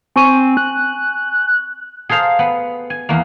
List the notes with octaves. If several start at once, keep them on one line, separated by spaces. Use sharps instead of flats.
C4 G#5 C#6 D#7
F#6
G#4 A4 C5 F5 A#5
B3
G#5
E2 A#3